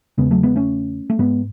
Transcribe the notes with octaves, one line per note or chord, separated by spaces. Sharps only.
E2 C#3 G#3 B3
F#3 A3
G#3 B3
A3 C#4
A3
G#2 G#3 B3